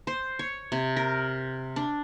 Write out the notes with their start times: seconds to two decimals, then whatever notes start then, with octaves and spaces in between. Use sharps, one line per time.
0.07 C5
0.39 C#5
0.72 C3
0.96 A#4
1.76 D4